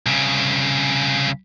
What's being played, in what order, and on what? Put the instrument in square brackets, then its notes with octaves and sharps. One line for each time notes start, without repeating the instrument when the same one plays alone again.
[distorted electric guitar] C2 C#3